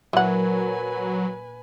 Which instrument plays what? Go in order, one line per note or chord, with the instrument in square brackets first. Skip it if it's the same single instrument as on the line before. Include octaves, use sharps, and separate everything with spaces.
[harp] A#2 [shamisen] E3 F#5 [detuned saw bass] F#3 [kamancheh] B4 G#5